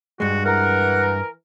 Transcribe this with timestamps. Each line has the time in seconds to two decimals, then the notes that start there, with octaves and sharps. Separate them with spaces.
0.20 G2 G#3 F#4
0.45 E3 A#4 F#5